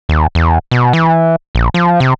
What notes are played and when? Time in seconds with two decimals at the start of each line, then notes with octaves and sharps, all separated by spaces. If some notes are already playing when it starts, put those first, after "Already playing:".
0.09 D#2
0.35 E2
0.71 B2
0.93 E3
1.55 A#1
1.74 F3
2.00 C3